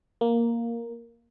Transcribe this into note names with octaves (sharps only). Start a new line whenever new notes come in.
A#3